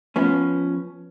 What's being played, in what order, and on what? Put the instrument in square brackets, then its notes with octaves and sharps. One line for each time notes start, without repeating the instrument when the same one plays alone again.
[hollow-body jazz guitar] F3 B3 C#4